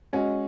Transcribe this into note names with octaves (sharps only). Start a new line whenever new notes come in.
G#3 C#4 F#4